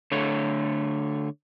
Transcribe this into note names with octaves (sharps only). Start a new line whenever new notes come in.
D3 A3 C#5